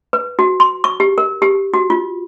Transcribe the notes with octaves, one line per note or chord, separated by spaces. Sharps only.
B4
F#4
C6
C#6
G4
A#4
G4
F#4
F4